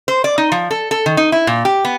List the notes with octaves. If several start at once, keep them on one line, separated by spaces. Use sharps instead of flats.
C5
D5
D#4
F3
A4
A4
D#3
D#4
E4
A#2
G4
B3